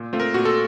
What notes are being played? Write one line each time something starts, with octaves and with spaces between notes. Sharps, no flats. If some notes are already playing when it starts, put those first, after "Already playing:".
Already playing: A#2
A3 C4 F4
A#4
A#2 F#4
A4